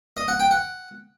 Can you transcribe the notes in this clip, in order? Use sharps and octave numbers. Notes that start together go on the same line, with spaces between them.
D#5
F#5
G5
F#5